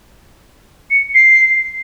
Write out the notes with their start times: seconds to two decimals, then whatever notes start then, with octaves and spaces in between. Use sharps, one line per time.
0.91 C#7
1.15 C7